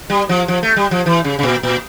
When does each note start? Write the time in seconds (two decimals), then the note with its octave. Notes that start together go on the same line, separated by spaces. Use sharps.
0.10 G3
0.29 F3
0.48 F3
0.63 A3
0.76 G3
0.91 F3
1.06 E3
1.24 C#3
1.39 C#3
1.43 A#2
1.63 A#2